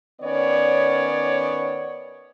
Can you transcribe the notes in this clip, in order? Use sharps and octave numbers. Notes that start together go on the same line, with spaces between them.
D#3 B3 C#4 C#5 D5